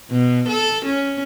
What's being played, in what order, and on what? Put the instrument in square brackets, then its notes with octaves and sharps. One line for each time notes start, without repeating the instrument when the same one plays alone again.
[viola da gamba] B2
A4
C#4